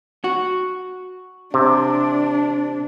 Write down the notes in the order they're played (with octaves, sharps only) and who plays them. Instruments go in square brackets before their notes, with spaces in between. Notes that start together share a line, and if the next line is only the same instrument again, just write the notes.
[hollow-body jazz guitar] F#4
[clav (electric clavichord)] C3 [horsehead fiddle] D4